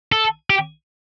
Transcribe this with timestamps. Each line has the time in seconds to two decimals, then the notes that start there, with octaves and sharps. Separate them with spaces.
0.12 A4
0.50 G4